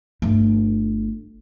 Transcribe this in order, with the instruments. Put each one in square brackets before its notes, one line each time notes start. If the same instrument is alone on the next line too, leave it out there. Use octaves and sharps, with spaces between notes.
[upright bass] G1 A3